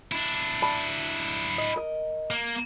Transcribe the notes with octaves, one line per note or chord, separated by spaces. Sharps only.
D4 E4
D5 A5 B5
D#5
A#4 D#5
A#3